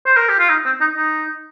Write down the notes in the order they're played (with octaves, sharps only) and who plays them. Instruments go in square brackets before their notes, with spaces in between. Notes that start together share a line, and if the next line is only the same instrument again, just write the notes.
[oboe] C5
A#4
G4
F4
D#4
C4
D#4
D#4